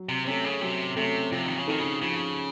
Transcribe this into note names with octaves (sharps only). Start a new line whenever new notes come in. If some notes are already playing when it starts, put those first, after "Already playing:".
Already playing: F#3
C3
C3 A3 C#4
C#3
C3 F#3
C3 A3 C#4
C3 F3
D#3
C#3
D#3 C4 D#4 A4
C#3
C#3 F3